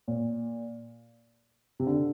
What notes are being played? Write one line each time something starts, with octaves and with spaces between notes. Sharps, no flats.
A#2
C3
D3